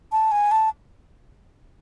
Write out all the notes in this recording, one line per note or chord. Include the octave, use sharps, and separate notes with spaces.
A5
G#5
A5